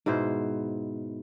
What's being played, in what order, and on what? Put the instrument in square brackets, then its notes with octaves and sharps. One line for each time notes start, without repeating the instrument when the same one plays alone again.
[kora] G#2 B2 E4 C5